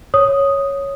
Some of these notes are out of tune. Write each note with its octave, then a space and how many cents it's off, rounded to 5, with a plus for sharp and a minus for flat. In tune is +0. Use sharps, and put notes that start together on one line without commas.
C#5 +0 D#6 +0